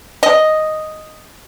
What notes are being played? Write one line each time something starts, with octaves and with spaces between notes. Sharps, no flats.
D#5